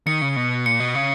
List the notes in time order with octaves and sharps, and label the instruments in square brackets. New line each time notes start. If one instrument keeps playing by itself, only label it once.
[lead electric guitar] D#3 [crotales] C#7
[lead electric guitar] C#3
B2
[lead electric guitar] A#2 [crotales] C#7
[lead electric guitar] B2
C#3